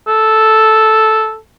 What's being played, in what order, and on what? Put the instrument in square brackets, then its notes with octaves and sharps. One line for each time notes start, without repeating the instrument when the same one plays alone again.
[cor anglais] A4